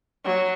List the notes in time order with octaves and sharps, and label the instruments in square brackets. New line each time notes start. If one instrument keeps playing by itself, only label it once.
[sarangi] F#3